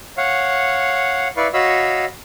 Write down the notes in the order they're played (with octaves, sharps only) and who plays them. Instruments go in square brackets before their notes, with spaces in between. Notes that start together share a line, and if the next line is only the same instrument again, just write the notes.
[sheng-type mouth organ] C#5 F5 F#5
E4 B4 D5 F5 C#6
F#4 C#5 D#5 F5 B5 E6